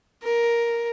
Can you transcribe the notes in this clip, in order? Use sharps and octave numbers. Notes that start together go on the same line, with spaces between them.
A#4